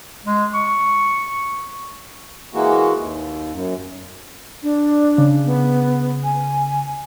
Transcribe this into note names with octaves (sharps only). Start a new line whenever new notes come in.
G#3
C#6
E3 G#3 A#3 F#4
D#2
F#2
D4
C#3
B3
G#5